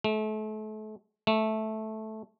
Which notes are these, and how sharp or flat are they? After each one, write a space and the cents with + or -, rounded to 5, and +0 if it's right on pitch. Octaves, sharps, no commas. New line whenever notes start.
A3 -35
A3 -10